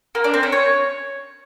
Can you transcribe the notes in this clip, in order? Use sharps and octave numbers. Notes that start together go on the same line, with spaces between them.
A#3
D4
C4
C#4
C#5